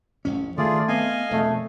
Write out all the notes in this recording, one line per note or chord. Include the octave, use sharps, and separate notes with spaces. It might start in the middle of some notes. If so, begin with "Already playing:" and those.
A1 F2 C#4
D2 D3 D#3 A3 F4 G#4 D5
B3 C4 D#5 F5 G#5
E1 F2 A3